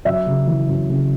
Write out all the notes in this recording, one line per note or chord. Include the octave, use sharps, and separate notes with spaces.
F#2 E5
C#3
E3
F#2
C#3